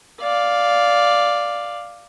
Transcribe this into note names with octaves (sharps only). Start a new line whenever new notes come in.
D5 F5